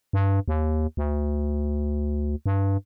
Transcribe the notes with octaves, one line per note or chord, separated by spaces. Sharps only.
G2
D#2
D2
G2